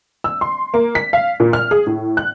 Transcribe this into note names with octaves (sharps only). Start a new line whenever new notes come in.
E6
C6
A#3
B6
F5
A#2
F6
G#4
A2
F#6